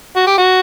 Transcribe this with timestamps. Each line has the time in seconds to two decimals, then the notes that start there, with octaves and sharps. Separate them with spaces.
0.16 F#4
0.27 G4
0.38 F#4